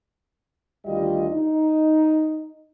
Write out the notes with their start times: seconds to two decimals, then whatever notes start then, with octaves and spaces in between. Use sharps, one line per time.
0.86 D2 D#3 G3 F4 D#5
1.32 D#4